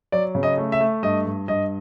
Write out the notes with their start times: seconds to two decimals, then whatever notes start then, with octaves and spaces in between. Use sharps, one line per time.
0.12 F#3 D5
0.35 C#3
0.43 D#5
0.57 A3
0.72 E5
0.80 A3
1.03 G2 D#5
1.26 G2
1.48 G2 D#5